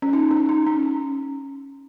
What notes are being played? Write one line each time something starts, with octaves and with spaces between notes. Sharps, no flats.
C#4
D#4
C#4
D#4
C#4